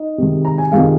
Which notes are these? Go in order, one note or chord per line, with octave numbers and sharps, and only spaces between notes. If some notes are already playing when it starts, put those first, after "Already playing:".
Already playing: D#4 D#5
C3 D#3 G#3
A#5
G#5
C3 D#3 G#3 F4 F5